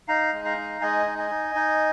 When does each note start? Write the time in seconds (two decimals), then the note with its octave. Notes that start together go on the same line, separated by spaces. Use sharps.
0.08 D#4 F5 A#5
0.33 G#3
0.45 F5 A#5
0.57 D#4
0.81 G#3 D#5 G#5
1.06 D#4
1.18 D#5 G#5
1.31 D#4
1.55 D#4